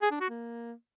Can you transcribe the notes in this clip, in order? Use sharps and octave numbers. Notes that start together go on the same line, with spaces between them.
G#4
D4
F#4
A#3